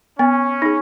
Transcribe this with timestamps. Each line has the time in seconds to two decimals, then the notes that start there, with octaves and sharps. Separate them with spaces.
0.19 B3 C#4
0.62 D#4 G#4